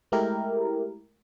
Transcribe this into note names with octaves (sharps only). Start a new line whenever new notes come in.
G#3 A3 E4 G4 A#4